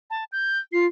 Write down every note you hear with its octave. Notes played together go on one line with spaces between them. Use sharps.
A5
G6
F4 C7